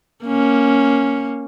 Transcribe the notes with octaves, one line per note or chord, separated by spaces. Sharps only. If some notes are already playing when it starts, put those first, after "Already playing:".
A#3 C#4